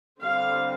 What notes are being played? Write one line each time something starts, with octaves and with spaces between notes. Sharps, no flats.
D3 G3 C4 F5